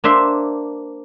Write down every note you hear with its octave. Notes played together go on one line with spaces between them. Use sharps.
A#3 D4 C5 E5 C6